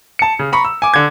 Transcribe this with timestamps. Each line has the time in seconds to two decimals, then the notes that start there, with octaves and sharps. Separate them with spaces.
0.19 A5 C#7
0.39 C#3
0.52 A#5 B5 C#6
0.65 E6
0.82 G#5 D6
0.94 D3 G#6